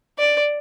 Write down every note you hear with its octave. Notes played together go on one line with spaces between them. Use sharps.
D5